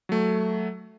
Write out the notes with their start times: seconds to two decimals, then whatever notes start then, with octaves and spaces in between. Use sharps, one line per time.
0.09 F#3 A3